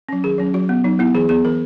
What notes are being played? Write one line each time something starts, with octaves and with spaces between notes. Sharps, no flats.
F#3 C#4
D#3 G#4
F#3 C#4
F#3 F#4
B3
F#3 D#4
B3 E4
E3 G#4
B3 G#4
E3 A#4